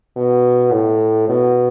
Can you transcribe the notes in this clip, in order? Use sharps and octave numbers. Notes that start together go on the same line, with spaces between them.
B2
A2
B2